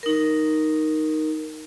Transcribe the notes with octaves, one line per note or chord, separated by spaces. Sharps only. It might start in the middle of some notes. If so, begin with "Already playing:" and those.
D#4 A#4